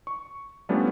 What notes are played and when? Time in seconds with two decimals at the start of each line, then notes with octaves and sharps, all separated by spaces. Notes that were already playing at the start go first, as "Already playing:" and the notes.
0.07 C#6
0.69 F3 G3 A3 B3 C#4 D4